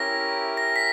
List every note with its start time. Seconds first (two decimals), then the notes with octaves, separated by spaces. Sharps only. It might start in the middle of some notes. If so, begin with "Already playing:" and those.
Already playing: C#4 E4 G4 A#4 A#6
0.57 A#6
0.76 B6